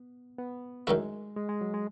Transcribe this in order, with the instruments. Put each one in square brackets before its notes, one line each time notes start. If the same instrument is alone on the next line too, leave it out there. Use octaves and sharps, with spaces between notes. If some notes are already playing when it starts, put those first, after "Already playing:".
Already playing: [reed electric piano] B3
B3
[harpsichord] F#2 D#3 A3 E4 [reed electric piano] G#3
[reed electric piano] G#3
G#3
F#3
G#3